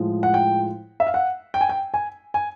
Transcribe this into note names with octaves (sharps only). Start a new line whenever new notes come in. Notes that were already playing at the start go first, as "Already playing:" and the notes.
Already playing: A2 F3 G#3
F#5
G5
E5
F5
F#5
G5
G#5
G5
G#5
G#5